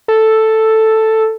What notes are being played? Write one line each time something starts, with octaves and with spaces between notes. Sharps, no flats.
A4